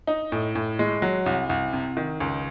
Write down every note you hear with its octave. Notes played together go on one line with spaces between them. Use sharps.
D#4
A2
A2
G#3
F#3
C2
C2
C3
D#3
C#2